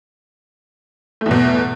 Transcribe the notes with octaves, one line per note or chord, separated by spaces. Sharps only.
E2 B2 A3